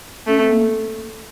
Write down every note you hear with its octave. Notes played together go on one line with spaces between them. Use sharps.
A3 C#4
C4
A#3